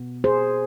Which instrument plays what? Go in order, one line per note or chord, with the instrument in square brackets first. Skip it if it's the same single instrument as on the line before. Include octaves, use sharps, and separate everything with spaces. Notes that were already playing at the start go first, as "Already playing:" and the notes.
Already playing: [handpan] B2 B3
G#4 C5